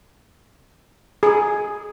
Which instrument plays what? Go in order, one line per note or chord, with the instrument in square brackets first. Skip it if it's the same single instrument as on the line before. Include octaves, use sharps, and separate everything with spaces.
[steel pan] G#4